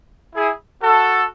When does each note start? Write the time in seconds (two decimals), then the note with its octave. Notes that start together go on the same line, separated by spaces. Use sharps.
0.36 E4 G#4
0.83 F#4 A4